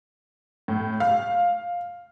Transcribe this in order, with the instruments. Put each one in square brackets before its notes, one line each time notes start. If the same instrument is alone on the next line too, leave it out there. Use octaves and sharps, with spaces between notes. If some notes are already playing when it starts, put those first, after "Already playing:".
[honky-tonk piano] A2
F5